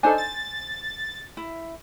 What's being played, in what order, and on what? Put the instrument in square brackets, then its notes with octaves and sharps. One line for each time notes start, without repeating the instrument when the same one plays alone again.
[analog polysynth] D4 D#4 A4 [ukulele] C5 G#5
[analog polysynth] A6
[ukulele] E4